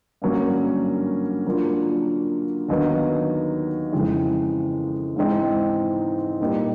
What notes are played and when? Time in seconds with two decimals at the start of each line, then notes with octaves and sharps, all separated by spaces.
0.22 G2 D3 F#3 A#3 C#4
1.45 D3 F#3 A#3 D4 F4
2.68 D#2 D3 F#3 B3 D#4
3.92 F2 C#3 E3 G#3 C4
5.16 G#2 E3 G#3 C4 D#4
6.40 A#2 G3 A#3 D#4 G4